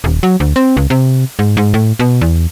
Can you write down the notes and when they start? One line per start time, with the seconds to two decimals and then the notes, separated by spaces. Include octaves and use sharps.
0.04 D#1
0.23 F#3
0.40 D2
0.56 C4
0.77 C#2
0.90 C3
1.39 G#2
1.57 G#2
1.74 A2
1.99 B2
2.21 E2